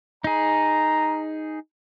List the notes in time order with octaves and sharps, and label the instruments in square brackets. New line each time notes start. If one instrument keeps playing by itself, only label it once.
[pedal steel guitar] D#4 G#4 [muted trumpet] A#5